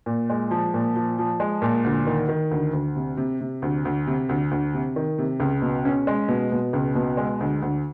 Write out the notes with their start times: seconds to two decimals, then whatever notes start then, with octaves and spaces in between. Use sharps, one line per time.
0.06 A#2
0.30 G#3
0.51 F3
0.74 A#2
0.96 F3
1.19 F3
1.40 G#3
1.62 A#2
1.84 D2
2.07 D#3
2.29 D#3
2.51 D2
2.73 D2
2.96 C3
3.17 C3
3.40 C3
3.62 D2
3.85 D2
4.07 C3
4.29 D2
4.51 D2
4.74 C3
4.96 D#3
5.18 C3
5.40 C#2
5.62 B2
5.85 C#4
6.07 G#3
6.28 B2
6.52 B2
6.73 C#2
6.95 B2
7.17 G#3
7.40 D2
7.62 D2